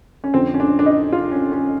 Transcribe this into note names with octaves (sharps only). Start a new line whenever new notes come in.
C#4
F2 D3 C4
C#4
D4
D4
D#4
F4
C#4
C#4